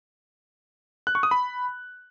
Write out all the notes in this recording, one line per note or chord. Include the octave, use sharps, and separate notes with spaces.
F#6
C#6
D#6
B5